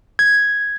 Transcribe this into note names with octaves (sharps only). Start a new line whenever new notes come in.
G#6